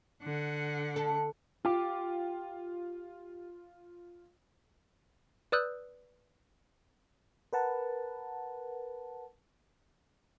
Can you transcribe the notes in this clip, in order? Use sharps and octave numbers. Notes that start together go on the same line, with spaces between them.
D3 F#5
A4
F4 G4
B4 D5 D#6 E6 F#6 G6
A#4 B4 F#5 A5